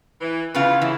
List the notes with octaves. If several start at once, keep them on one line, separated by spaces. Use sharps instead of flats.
E3
C#3 E3 B3 F4 F5
D2 C#3 E3 E4